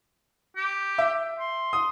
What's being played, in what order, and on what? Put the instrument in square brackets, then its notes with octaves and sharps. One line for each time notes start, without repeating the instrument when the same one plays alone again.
[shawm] G4
[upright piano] E5
[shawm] C6
[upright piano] D#6